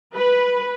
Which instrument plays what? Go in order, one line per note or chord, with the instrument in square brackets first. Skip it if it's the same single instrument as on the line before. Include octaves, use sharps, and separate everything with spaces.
[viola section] B4